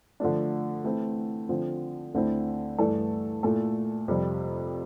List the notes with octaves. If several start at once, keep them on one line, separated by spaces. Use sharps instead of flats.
D3 F3 A3 D4
E3 A3 C4 E4
D3 F3 C4
D2 D3 A3 C4 E4
G2 E3 A3 D4 A4
A#2 A3 E4 A4
F2 C3 G3